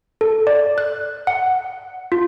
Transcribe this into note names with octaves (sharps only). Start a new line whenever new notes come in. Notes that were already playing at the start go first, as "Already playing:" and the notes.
A4
D5
F#6
F#5
F4